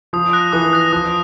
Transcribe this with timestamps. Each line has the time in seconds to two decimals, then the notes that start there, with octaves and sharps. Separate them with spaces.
0.13 F3 D#6
0.33 F#6 A#6
0.53 E3 D#6
0.73 F#6 A#6
0.92 F3 D#6